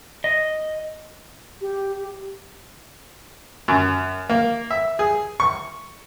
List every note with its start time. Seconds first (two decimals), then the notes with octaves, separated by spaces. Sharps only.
0.24 D#5
1.61 G4
3.68 F#2
4.30 A#3
4.70 E5
4.99 G#4
5.40 C#6